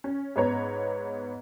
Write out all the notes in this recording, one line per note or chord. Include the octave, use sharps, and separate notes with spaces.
C#4
G#2 B3 C#5 A#5